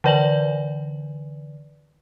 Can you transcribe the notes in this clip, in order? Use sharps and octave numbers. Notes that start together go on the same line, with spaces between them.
D3 E3 B4 D5 G#5 F#7